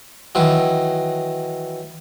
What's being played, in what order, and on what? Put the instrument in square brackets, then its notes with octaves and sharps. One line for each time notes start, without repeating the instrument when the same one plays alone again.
[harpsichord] D#3 E3 F#3